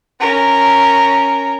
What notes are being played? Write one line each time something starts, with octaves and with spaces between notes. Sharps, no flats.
C#4 A#4